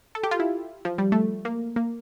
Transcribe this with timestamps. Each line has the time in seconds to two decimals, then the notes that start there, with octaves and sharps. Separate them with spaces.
0.15 A4
0.23 G4
0.31 F4
0.40 E4
0.85 F3
0.98 G3
1.12 A3
1.45 A#3
1.76 A#3